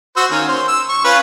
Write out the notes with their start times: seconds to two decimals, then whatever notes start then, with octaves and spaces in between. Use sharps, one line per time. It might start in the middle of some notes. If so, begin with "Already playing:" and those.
0.16 F#4 C5 E6
0.31 D#3 A#3 C#4
0.48 C5
0.68 E6
0.89 C#6
1.04 C#4 F4 B4